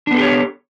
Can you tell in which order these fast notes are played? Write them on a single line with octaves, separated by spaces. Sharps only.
D4 B3 A4 G4 C#5